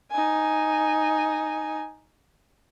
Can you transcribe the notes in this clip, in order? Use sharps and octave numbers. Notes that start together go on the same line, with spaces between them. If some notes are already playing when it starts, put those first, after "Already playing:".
D#4 G#5